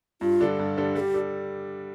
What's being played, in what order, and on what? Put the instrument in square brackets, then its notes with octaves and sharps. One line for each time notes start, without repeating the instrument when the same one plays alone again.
[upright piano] G2 [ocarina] F4
[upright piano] D3 G3 D4 A4
G2
D3 G3 D4 A4
[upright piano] G3 [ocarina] A4
[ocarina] G4
[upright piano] D4 A4